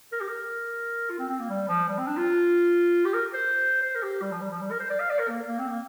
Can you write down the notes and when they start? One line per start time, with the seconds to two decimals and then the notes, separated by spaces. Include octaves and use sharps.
0.12 A#4
0.21 G4
0.28 A#4
1.10 F4
1.19 C4
1.29 C4
1.39 A#3
1.49 G3
1.68 F3
1.88 G3
1.98 C4
2.07 D4
2.17 F4
3.05 G4
3.14 A#4
3.34 C5
3.82 C5
3.95 A#4
4.03 G4
4.22 G3
4.32 F3
4.41 G3
4.51 F3
4.61 G3
4.71 A#4
4.80 C5
4.90 D5
4.99 F5
5.10 D5
5.19 A#4
5.29 A#3
5.48 A#3
5.59 C4
5.68 A#3